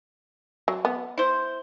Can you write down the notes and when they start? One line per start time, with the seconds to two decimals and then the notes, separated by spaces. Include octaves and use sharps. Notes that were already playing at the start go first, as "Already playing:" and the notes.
0.68 F#3
0.85 B3
1.18 E4 C5